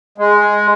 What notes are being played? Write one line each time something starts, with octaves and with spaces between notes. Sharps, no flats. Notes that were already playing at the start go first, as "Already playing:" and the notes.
G#3